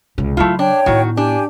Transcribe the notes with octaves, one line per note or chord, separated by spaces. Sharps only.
C#2 C#3
C#3 F#3 A3 E4 F4
D4 C#5 G5
A2 D#3 B3 F#4
D4 G4 G#5 A5